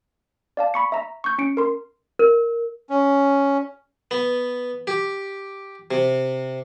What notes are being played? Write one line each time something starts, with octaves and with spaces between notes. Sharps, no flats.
D5 F5 A5
B5 C#6 C#7
E5 A#5
C#6 G6
C#4 C#7 D7
A#4 C6
A#4
C#4
B3
G4
C3